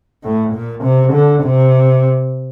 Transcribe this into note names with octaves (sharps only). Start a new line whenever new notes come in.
A2
A#2
C3
D3
C3